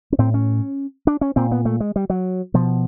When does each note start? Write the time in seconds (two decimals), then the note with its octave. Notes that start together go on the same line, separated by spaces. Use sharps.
0.12 C#4
0.18 A2 C4
0.34 C#4
1.07 D4
1.21 C#4
1.36 A#2 C4
1.51 B3
1.65 A3
1.80 G#3
1.96 G3
2.10 F#3
2.54 B2 F3